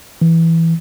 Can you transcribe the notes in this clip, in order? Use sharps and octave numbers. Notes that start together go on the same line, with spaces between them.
E3